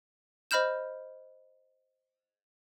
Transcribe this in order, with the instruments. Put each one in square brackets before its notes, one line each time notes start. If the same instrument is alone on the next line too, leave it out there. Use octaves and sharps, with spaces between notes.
[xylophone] C5 D#5 B5 F6 G6 E7